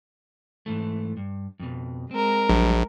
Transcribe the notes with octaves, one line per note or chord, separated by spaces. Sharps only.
G#2 E3 A3
G2
F2 B2
G#3 C4 A#4
A#1 F#3 G3 D4